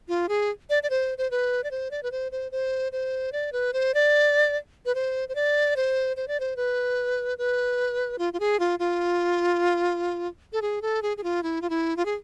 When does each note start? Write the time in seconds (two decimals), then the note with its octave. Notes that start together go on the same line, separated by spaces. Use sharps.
0.08 F4
0.29 G#4
0.70 D5
0.83 D5
0.90 C5
1.18 C5
1.31 B4
1.64 D5
1.71 C5
1.91 D5
2.03 B4
2.12 C5
2.32 C5
2.52 C5
2.92 C5
3.32 D5
3.53 B4
3.73 C5
3.94 D5
4.86 B4
4.95 C5
5.29 C5
5.35 D5
5.76 C5
6.17 C5
6.28 D5
6.40 C5
6.56 B4
7.38 B4
8.19 F4
8.33 F4
8.40 G#4
8.60 F4
8.79 F4
10.53 A4
10.62 G#4
10.82 A4
11.02 G#4
11.17 G#4
11.24 F4
11.43 E4
11.62 F4
11.70 E4
11.97 F4
12.05 G#4